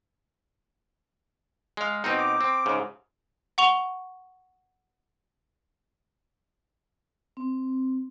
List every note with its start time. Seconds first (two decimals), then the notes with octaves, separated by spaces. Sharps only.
1.77 G#3 F5
2.04 B2 C4 D#4
2.18 D6
2.41 C4
2.66 G#2 C#3
3.58 F#5 C#6 F7 G7
7.37 C4